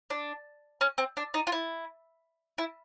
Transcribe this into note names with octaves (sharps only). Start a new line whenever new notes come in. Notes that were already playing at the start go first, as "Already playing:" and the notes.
D4
C#4
C4
D4
D#4
F4
E4
E4